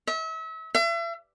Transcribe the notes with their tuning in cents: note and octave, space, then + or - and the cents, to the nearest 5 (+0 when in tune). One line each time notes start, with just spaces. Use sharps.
E5 -35
E5 +40